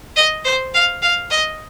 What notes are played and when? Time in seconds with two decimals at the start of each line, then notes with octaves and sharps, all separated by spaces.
0.16 D#5
0.45 C5
0.74 F5
1.02 F5
1.31 D#5